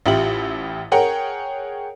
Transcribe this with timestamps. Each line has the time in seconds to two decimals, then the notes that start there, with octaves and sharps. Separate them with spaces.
0.06 A1 E4 F4 G4 F#7
0.92 G#4 A#4 C#5 F#5 G5